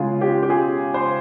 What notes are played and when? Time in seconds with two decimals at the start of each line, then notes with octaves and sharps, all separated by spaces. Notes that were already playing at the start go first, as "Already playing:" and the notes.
Already playing: C#3 G#3 F4 G#4
0.21 G4
0.43 G4
0.50 G#4
0.94 C5